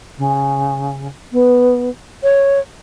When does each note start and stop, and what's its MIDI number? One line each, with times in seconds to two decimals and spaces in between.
0.17 1.07 49
1.32 1.89 59
2.23 2.59 73